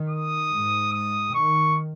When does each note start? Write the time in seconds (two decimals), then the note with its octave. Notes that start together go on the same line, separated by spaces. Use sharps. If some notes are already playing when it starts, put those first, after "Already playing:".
Already playing: D#3
0.09 D#6
0.51 G#2
0.93 D#6
1.34 D#3 C#6